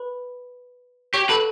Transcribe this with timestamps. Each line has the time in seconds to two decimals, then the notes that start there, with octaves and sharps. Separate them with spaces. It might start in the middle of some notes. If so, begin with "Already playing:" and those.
Already playing: B4 B5
1.14 G4 C#5 C#6
1.29 A4 B4 A5